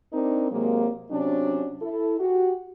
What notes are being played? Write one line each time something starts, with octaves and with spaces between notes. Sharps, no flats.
C4 D4 D#4 A#4
C3 F#3 G#3 A#3
C3 F#3 C#4 D4
E4 A4
F#4 G4